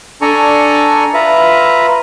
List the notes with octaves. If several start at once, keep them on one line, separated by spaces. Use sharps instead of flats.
D4 A4 D5 G#5 A#5 C#6
F4 B4 E5 A#5